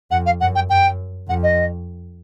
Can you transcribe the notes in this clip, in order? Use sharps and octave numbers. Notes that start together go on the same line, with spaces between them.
F2 F#5
F5
F#2 F#5
G5
F#2 G5
F2 F#5
D#5